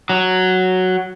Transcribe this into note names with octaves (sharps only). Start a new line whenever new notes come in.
F#3